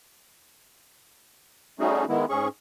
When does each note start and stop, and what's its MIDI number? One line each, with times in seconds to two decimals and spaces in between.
1.79 2.05 55
1.79 2.05 57
1.79 2.05 61
1.79 2.05 63
1.79 2.05 66
1.79 2.05 68
2.08 2.25 51
2.08 2.25 56
2.08 2.25 59
2.08 2.25 64
2.29 2.48 44
2.29 2.48 61
2.29 2.48 68
2.29 2.48 85